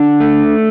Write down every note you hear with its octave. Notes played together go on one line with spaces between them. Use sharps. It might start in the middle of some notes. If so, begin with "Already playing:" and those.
Already playing: D3 D4
A3